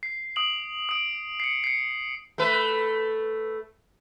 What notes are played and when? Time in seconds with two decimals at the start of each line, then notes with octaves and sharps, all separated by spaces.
0.03 C7
0.36 D#6 D7 F#7
0.89 D#6 D7
1.40 C7 C#7
1.64 C7 C#7
2.38 A3 B4